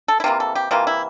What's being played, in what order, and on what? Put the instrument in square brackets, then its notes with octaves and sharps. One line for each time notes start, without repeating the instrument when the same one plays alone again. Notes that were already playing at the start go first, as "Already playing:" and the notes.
[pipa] A4
E4
C3 E3 A#3 F4
A4
G4
C3 E3 A#3 F4
E4